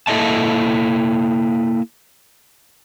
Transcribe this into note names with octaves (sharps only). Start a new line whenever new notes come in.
A#3 E4 A4 D#5 E5 A5